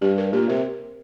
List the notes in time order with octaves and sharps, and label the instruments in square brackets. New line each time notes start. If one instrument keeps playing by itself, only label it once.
[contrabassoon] G2 [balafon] G4
[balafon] A#4
[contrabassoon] A#2 [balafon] G4
[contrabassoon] C3 [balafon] A#4